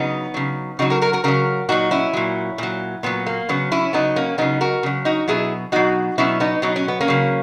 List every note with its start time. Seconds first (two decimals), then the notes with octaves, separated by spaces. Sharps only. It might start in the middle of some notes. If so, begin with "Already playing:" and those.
Already playing: C#3 F#3 B3 D#4
0.34 C#3 F#3
0.79 C#3 F#3 D#4 F#4
0.90 F#4 A#4
1.02 F#4 A#4
1.13 F#4 A#4
1.24 C#3 F#3 F#4 A#4
1.69 A#2 F#3 D#4 F#4
1.91 C#4 E4
2.13 A#2 F#3
2.58 A#2 F#3
3.03 A#2 F#3 B3
3.26 A#3
3.49 C#3 F#3 B3
3.72 C#4 E4
3.93 C#3 F#3 B3 D#4
4.16 A#3 C#4
4.38 C#3 F#3 B3 D#4
4.61 F#4 A#4
4.83 C#3 F#3
5.05 D#4 F#4
5.28 B2 F#3 E4 G#4
5.72 B2 F#3 D#4 F#4
6.18 B2 F#3 C#4 E4
6.40 B3 D#4
6.62 B2 F#3 D#4
6.76 C#4
6.88 B3
7.01 A#3 C#4
7.08 C#3 F#3